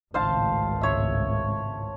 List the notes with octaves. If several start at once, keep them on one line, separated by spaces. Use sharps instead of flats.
G#1 C#2 A2 C5 F5 A5
C#5 E5